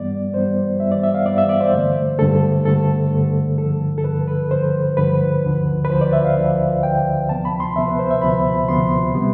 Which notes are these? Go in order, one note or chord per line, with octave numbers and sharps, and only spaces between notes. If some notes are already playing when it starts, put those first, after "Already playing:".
Already playing: G2 E3 G3 B3 D5
G2 E3 G3 B3 C5
G2 E3 G3 B3 E5
D5
E5
F5
G2 E3 G3 B3 D5
E5
D5
C5
G2 D3 A3
G2 D3 A3 A4
G2 D3 A3 A4
G2 D3 A3
G2 D3 F3 A4
A4
G2 D3 F3 B4
B4
G2 D3 F3 C5
G2 D3 F3 B4
D2 D3 F3
B4
D2 D3 F3 C5
D5
E5
F5
D2 D3 F3
D2 D3 F3 G5
D2 C3 F3 B3 A5
B5
C6
D2 C3 F3 B3 E5
B4
C5
E5
D2 C3 F3 B3 B5
D2 C3 F3 B3 C6
C3 G3 B3